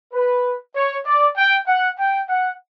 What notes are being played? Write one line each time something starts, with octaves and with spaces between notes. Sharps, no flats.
B4
C#5
D5
G5
F#5
G5
F#5